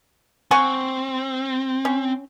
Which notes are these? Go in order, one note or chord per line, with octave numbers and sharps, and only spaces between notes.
C4 F#5 G#5 C#6
C#4